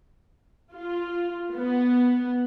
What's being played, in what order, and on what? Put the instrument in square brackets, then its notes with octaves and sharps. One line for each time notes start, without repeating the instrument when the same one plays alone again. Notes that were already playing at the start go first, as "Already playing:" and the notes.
[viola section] F4
B3